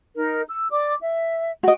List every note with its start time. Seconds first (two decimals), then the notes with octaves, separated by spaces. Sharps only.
0.16 D#4 A#4
0.50 E6
0.70 D5 D6
1.01 E5
1.63 F#4 D#5 G5